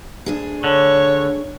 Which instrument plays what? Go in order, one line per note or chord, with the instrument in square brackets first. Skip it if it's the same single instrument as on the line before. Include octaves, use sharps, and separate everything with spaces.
[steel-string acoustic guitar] D2 D4 G#4
[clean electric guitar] D3 [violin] C#5